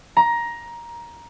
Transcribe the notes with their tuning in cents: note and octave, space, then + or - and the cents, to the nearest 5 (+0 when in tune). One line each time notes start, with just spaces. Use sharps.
A#5 +15